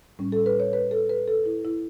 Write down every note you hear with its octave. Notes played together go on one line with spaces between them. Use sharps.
A2 G3 C#4
A4
B4
C#5
B4
A4
B4
A4
E4
E4